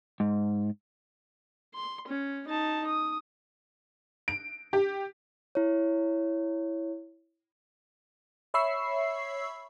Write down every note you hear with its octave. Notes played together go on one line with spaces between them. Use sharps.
G#2
C6
C#4
D#4 A5
D#6
D7
G4
E4 C#5
C#5 E5 B5 C#6 E6 C7